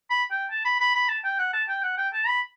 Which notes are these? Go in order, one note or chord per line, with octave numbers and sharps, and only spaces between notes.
B5
G5
A5
B5
B5
B5
A5
G5
F#5
A5
G5
F#5
G5
A5
B5